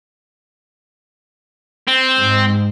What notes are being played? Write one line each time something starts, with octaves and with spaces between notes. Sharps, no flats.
C4
G#2